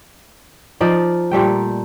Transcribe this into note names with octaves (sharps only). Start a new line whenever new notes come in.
F3 D#4 D5
A#2 G3 A3 G5